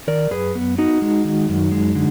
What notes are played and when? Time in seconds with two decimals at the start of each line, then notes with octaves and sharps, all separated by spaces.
0.07 D#3 A#4 D5
0.31 F#2 G#4 B4
0.55 B3
0.78 B3 D#4 F#4
1.02 G#3
1.25 D#3
1.49 F#2
1.72 G#3
1.95 D3